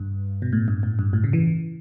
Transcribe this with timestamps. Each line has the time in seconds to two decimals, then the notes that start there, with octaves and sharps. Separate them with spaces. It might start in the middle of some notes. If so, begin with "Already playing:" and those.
Already playing: G2
0.42 B2
0.53 A2
0.68 G2
0.83 A2
0.99 G2
1.13 A2
1.24 C#3
1.33 E3